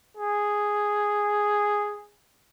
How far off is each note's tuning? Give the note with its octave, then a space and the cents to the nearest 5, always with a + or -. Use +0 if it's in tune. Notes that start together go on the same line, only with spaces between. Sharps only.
G#4 -5